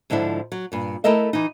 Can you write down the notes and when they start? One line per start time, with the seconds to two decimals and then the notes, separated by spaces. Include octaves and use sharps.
0.10 G#2 D3 F3 D4 E4
0.52 F#3
0.72 G2 A#2
1.04 A3 E4 A4 A#4 D#5 E5
1.33 E3 D#4